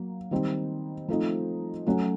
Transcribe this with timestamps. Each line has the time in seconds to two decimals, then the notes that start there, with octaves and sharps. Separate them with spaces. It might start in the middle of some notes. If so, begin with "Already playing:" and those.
Already playing: F#3 A#3
0.31 D#3 G3 C4 D#4
1.08 F3 A3 C4 D#4
1.86 F#3 A3 C#4 F#4